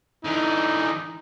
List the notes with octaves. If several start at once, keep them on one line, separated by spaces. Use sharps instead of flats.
D3 E3 D#4